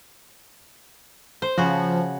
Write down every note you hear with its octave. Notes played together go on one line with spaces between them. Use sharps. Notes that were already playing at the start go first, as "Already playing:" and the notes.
C5
C#3 F3 F#4